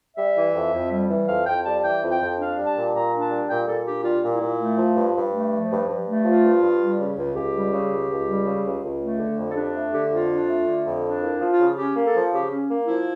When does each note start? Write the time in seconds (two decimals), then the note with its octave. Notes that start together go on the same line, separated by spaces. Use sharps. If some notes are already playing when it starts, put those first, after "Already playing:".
0.17 G3 E5
0.36 E3
0.55 F2
0.73 F2
0.92 G3
1.10 E3
1.28 F2 F5
1.47 F2 G5
1.65 G3 A5
1.83 E3 G5
2.02 F2
2.11 G5
2.20 F2
2.38 D4 F5
2.57 G3
2.66 A5
2.76 A#2
2.94 A#2 A#5
3.12 D4
3.22 A5
3.31 G3
3.49 A#2 G5
3.67 A#2 A4
3.86 D4 G4
4.04 G3 F4
4.23 A#2
4.32 E4
4.41 A#2
4.59 A3
4.78 F3
4.96 G2
5.15 G2
5.33 A3
5.52 F3
5.70 G2
5.88 G2
6.06 A3
6.25 F3 F4
6.43 G2
6.62 G2
6.80 G3
6.99 C#3
7.17 C#2
7.35 C#2 G4
7.54 G3
7.72 C#3
7.91 C#2
8.09 C#2
8.28 G3
8.46 C#3
8.64 C#2
8.83 C#2
9.01 A3
9.20 D3
9.38 F2
9.51 A4
9.56 D4 G4
9.75 A3
9.93 D3 G4
10.11 F2 F4
10.29 D4
10.49 A3
10.67 D3
10.85 F2
11.04 D4
11.21 A#3 E4
11.40 F3
11.49 F4
11.59 C#3
11.77 C#4 G4
11.96 A#3
12.05 A4
12.14 F3
12.32 C#3 G4
12.51 C#4
12.70 A#3
12.87 F3 E4